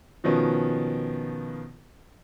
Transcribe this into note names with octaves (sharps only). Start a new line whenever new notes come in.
B2 D#3 F3 B3 C#4